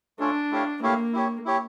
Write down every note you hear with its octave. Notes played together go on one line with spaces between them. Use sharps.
A3 C#4 D4 F4 A4 C#5
A3 E4 G4 C#5 F5
A3 A#3 E4 G4 C#5 F5
E4 G4 C#5
E4 G4 C#5